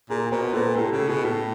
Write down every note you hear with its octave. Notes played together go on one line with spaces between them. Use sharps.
A#2 G#4 A#4
B2 A#4 C5
A#2 A4 B4
A2 G4 A4
C#3
A4
B2 F#4 G#4
A2